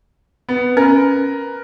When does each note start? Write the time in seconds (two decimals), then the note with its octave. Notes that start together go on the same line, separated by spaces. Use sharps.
0.49 B3
0.77 C#4 A#4 B4